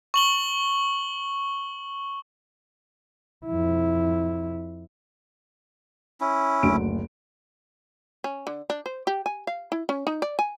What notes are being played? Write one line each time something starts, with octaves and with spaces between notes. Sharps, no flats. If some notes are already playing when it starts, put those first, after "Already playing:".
C#6 F#7 G7
F2 E4
C#4 E4
F#1 D2 D7
C#4
D3
D4
C5
G4
G#5
F5
E4
C#4
D#4
D5
G#5